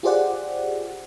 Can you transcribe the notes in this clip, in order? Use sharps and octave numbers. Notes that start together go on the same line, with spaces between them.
F4 G4 G#4 C5 D5 F#5